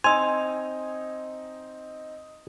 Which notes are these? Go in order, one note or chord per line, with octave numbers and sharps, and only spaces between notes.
C4 D#4 G#5 C6 E6